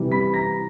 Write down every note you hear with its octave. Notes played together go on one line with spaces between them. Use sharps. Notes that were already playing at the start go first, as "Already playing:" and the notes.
Already playing: C3 E3 G3
B5 B6
A#5 A#6